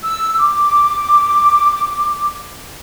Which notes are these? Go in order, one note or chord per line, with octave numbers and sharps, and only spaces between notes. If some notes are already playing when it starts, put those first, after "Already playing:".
E6
D6